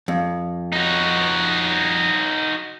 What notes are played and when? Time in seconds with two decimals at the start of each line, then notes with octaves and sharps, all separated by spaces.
0.08 F2
0.73 D#4 F#4